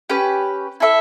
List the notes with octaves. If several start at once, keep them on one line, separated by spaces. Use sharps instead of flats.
C#4 G4 B4
E4 A4 E5